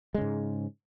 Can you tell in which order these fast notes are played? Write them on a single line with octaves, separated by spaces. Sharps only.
G#3 C#3 G#2